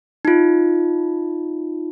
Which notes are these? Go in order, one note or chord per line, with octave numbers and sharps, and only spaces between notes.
D#4 F4